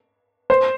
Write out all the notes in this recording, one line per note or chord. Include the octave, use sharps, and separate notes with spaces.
C5